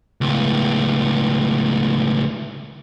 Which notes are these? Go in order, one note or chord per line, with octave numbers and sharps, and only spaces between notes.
C#2 A2